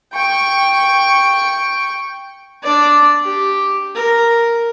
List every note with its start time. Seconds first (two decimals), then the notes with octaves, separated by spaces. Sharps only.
0.13 G5 C#6
2.63 D4 D5
3.25 G4
3.95 A#4